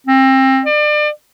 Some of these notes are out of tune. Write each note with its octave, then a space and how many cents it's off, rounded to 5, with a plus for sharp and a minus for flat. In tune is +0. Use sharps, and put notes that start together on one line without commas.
C4 +25
D5 +30